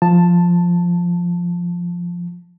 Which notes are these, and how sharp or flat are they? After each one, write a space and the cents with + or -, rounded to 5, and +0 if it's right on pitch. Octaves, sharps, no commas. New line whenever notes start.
F3 +0 A5 +0